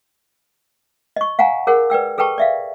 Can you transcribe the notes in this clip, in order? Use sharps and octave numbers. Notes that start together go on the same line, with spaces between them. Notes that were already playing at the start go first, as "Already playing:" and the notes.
D#5 C#6
F5 F#5 G#5 A#5
G#4 A#4 C#5 F#5
B4 D5 G5 E6
G#4 A4 B4 G5 A5 C#6
D5 E5 F5